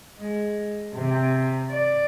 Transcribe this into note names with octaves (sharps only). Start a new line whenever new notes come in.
G#3
C3
D5